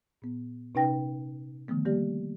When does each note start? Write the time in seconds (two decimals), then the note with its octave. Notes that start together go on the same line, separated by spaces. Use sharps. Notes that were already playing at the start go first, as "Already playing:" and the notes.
0.22 A#2 B3
0.75 C3 C#4 D#4 B4 G5 A#6
1.68 D3 D#3 F3 A3 B3
1.85 G3 A#3 G4 D5